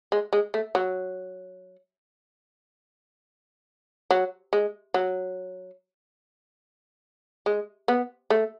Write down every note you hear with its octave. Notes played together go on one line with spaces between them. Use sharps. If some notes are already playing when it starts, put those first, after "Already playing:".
G#3
G#3
A3
F#3
F#3
G#3
F#3
G#3
B3
A3